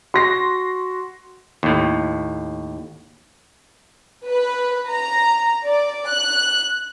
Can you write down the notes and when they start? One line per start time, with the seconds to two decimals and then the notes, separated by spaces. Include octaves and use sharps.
0.14 F#4 C6 A#6 C7
1.63 D#2 A2
4.26 B4
4.89 A#5
5.66 D5
6.08 F#6